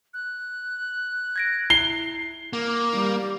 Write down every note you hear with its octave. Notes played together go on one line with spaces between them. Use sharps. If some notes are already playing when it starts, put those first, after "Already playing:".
F#6
G#6 A#6 D7
E4 C7 G7
A#3
G3